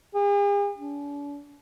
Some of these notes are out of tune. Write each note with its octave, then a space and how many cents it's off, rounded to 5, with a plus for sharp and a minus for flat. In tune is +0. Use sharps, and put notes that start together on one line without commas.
G#4 -45
D4 -45